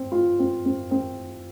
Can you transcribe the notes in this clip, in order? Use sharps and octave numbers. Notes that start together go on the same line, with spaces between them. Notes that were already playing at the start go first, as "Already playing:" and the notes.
Already playing: C4
F4
C4
C4
C4